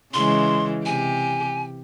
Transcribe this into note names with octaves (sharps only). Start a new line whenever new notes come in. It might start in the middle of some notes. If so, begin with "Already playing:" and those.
C#3 E3 G#3 C6
C3 G4 G#5